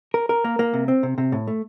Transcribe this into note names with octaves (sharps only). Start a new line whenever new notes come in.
A#4
A#4
A#3
A#3
C3
C4
C3
C3
A2
A3